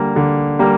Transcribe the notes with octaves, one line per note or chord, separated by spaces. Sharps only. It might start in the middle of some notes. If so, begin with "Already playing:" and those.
Already playing: D3 G3 A#3
D3
G3 A#3